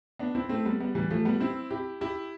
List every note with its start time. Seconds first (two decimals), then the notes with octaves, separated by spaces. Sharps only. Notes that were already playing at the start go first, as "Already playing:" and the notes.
0.19 B3 D4
0.35 C4 E4
0.49 A3 C4
0.65 G3 B3
0.80 G3 B3
0.95 E3 G3
1.10 F3 A3
1.25 G3 B3
1.40 C4 E4
1.71 E4 G4
2.01 E4 G4